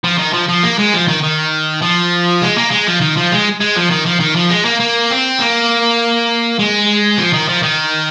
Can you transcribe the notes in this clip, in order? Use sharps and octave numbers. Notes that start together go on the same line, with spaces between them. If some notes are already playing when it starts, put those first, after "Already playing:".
F3
D#3
F3
F3
A#3
G#3
F3
D#3
D#3
F3
G#3
A#3
G#3
F3
D#3
F3
G#3
G#3
F3
D#3
F3
D#3
F3
G#3
A#3
A#3
C4
A#3
G#3
F3
D#3
F3
D#3